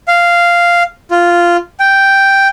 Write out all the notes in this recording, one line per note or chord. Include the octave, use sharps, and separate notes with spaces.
F5
F4
G5